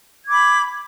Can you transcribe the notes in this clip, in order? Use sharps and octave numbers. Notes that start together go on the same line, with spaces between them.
B5 D6 G#6